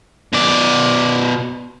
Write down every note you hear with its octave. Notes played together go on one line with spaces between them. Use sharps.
B2 D5